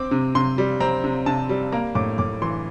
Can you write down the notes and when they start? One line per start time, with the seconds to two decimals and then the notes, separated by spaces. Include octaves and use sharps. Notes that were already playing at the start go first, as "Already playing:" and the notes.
Already playing: C4 D6
0.11 C3
0.35 C3 C6
0.58 G3
0.80 C4 A#5
1.04 C3
1.26 C3 A5
1.49 G3
1.72 A#3 A#5
1.95 A2 D6
2.18 A2 D6
2.42 E3 C6